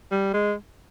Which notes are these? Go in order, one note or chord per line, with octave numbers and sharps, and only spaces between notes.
G3
G#3